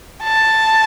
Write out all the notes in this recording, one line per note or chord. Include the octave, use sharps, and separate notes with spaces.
A5